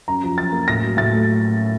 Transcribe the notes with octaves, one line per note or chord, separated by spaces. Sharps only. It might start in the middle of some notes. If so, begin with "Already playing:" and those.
F#2 A#5
F3
F#2 A6
A#3
A2 A#6
F#3
A2 A6
A3